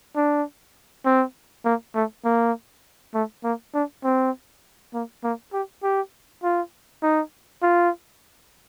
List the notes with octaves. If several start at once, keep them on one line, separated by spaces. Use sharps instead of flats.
D4
C4
A#3
A3
A#3
A3
A#3
D4
C4
A#3
A#3
G4
G4
F4
D#4
F4